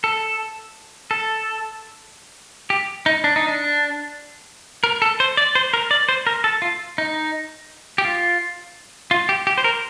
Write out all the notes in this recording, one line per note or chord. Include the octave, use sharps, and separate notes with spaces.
A4
A4
G4
D#4
D4
D#4
D4
A#4
A4
C5
D5
C5
A#4
D5
C5
A#4
A4
F4
D#4
G4
F4
F4
G4
G4
C5
A#4